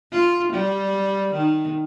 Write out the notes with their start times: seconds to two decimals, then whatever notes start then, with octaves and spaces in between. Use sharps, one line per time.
0.12 F4
0.52 G3
1.33 D#3